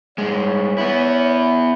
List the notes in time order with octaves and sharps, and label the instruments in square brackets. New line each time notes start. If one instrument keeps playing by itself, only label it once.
[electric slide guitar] G2 G#3 [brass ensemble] C#5
[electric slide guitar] B3 E4